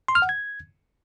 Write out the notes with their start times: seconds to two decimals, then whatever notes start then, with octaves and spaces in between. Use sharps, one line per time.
0.08 C6
0.15 F6
0.22 F#5
0.29 G#6